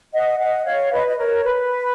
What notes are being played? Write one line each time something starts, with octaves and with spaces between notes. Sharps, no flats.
D#5 F#5
D#5 F#5
C#5 F5
B4 D#5
D#5
A#4 C#5
B4